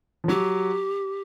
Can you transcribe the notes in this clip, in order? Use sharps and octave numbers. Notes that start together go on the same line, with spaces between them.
F3
F#3 G4